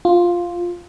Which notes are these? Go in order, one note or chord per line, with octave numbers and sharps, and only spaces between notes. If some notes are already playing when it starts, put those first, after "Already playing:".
F4